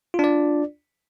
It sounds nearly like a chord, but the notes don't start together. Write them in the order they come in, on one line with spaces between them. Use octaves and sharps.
F4 D4 D5